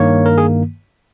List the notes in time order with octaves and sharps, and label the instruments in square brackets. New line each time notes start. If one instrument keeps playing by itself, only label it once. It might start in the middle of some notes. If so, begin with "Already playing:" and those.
Already playing: [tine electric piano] G2 D#3 A#3 C#5
A#4
G#4